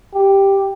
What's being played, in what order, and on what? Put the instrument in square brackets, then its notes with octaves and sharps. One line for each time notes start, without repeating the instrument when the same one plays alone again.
[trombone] G4